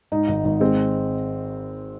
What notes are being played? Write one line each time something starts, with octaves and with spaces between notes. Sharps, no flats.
G#2 D#4
G#1
G#1
G#3 C4